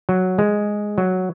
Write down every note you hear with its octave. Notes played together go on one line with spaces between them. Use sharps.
F#3
G#3
F#3